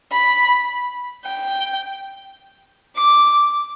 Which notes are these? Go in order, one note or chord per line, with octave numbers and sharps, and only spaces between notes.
B5
G5
D6